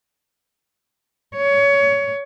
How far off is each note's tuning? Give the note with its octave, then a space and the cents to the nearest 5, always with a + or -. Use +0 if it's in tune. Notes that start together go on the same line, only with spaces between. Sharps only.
C#5 +20